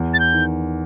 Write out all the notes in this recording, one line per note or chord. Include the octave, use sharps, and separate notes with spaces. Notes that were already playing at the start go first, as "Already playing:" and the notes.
Already playing: E2
A6
G6
D#3